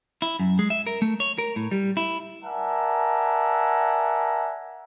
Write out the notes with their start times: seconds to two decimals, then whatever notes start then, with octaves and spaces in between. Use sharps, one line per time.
0.22 E4
0.39 F#2
0.59 G#3
0.70 E5
0.87 A#4
1.02 A3
1.20 C#5
1.38 A#4
1.56 A2
1.71 G3
1.97 E4
2.45 A#4 D5 E5 F#5 G#5 A5